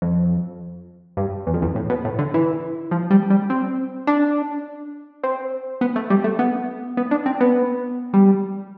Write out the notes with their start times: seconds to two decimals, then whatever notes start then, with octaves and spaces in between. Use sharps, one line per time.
0.02 F2
1.17 G2
1.47 E2
1.54 F2
1.62 E2
1.75 A2
1.90 B2
2.05 A2
2.19 D3
2.34 E3
2.91 F3
3.10 G3
3.30 G3
3.50 C4
4.07 D4
5.23 C4
5.81 B3
5.96 A3
6.10 G3
6.24 A3
6.39 B3
6.97 B3
7.11 D4
7.26 C4
7.41 B3
8.14 G3